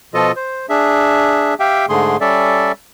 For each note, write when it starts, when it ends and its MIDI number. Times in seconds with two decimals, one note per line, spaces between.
0.14 0.32 47
0.14 0.32 53
0.14 0.32 65
0.14 0.32 69
0.14 0.32 75
0.36 0.66 72
0.69 1.54 62
0.69 1.54 68
0.69 1.54 76
1.60 1.86 67
1.60 1.86 76
1.60 1.86 77
1.60 1.86 79
1.89 2.17 44
1.89 2.17 50
1.89 2.17 57
1.89 2.17 68
1.89 2.17 84
2.21 2.72 55
2.21 2.72 61
2.21 2.72 69
2.21 2.72 74
2.21 2.72 76